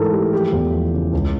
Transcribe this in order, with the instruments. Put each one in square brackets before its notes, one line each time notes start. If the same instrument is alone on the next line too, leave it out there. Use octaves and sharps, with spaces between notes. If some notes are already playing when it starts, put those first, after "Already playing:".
Already playing: [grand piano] G#2 E3 A3 A4 A#4
A3 G4
F3 G4
E2
F3
C#3
C#2